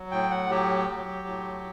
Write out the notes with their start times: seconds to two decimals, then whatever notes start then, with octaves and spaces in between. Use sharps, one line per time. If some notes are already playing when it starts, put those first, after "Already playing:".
Already playing: F#3
0.11 A2 G5
0.31 F#5
0.50 F#3 G4
0.89 F#3
1.27 A2